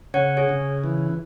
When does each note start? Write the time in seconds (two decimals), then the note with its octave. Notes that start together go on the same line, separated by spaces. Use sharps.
0.14 C#3 C#5 F#5
0.37 G#4 C#5
0.49 C#3
0.84 E3